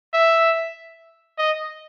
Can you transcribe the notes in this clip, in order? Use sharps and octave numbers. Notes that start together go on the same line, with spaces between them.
E5
D#5